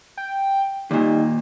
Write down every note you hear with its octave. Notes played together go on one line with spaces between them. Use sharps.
G5
D#2 A#2 G3 D#4